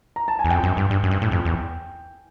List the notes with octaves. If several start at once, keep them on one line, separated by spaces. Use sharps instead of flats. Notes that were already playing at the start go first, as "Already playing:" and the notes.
A#5
A5
G#5
E2
F2 G5
F#2
G2
G2
F#2
G2
A2
F2
E2